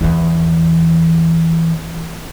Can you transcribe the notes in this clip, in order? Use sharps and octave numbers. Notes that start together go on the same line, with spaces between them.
E2 E3